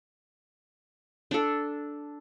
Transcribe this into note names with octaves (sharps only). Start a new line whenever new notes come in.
D4 A4